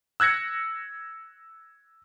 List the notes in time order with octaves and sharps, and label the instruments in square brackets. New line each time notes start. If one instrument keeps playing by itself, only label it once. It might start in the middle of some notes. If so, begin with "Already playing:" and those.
[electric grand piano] E6 F#6 G#6 A#6 C#7